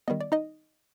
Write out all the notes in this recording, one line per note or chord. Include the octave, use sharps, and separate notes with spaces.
D#3 G3 B3 D#5
D5
D#4 D#5